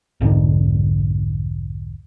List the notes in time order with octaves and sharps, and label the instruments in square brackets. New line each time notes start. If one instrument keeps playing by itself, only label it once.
[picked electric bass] B1 F2 G#2 D3